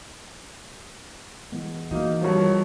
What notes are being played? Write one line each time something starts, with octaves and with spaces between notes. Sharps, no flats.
E3 G#3 B3
E3 A#3 D#4 F#4
G2 F3 G#3 F#4 A#4 C#5